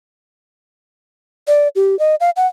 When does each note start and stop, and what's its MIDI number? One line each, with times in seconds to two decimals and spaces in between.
1.47 1.68 74
1.76 1.98 67
1.99 2.15 75
2.20 2.30 77
2.36 2.47 78